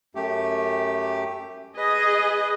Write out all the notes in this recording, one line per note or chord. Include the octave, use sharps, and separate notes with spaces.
F#2 A3 G4
G#4 B4 D#5